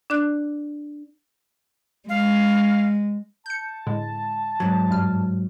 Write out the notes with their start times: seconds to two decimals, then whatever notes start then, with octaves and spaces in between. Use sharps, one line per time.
0.10 D4 D5 D6 F#6
2.09 G#3 F5
3.46 A5 G6 C#7
3.86 A2 D3 G#3
4.60 G#2 F#3
4.90 G2 G3 F6